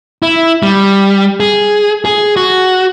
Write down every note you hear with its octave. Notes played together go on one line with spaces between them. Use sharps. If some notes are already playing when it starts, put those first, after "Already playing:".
E4
G3
G#4
G#4
F#4